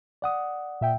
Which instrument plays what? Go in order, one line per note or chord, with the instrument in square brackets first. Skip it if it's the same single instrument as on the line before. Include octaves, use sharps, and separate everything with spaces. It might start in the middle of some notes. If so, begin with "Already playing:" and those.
[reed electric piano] D5 F#5 D#6
[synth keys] A#2 E5 G5